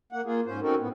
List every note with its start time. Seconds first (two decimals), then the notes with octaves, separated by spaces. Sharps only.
0.12 A#3 F#5
0.25 A#3 F4 G#4
0.46 G#2 C#4 C5
0.62 C4 C#4 D#4 F#4 A4 A#4
0.79 A2 B3